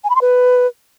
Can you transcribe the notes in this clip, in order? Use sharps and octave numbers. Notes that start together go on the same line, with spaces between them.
G#5
B5
C6
B4